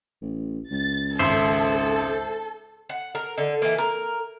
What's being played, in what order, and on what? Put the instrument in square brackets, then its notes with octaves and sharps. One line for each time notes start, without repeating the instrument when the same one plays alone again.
[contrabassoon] A1
[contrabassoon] C#2 [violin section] A6
[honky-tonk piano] G#1 C6 [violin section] A4 [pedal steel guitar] C5 E5
[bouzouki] F#5
A#4
D3
E3 A#3
A#4